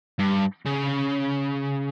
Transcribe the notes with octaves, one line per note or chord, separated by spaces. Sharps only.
G2
C#3